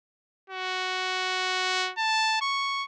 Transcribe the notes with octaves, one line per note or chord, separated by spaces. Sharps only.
F#4
A5
C#6